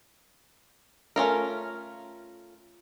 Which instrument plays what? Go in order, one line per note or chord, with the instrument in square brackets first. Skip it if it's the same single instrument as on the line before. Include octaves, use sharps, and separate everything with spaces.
[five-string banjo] A3 C#4 F4 A#4